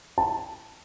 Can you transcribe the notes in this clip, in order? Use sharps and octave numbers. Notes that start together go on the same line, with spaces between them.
A5